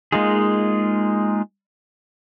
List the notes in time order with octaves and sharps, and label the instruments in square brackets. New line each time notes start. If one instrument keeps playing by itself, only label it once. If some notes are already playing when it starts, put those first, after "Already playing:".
[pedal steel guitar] G#3 A#3 D#4 F4 G#4